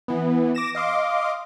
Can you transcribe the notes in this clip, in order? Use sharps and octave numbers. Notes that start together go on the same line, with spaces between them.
E3 B3
D6 A#6 E7
D#5 F5 C6 D6